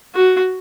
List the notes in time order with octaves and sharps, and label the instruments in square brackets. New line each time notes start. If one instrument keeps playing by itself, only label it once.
[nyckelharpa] F#4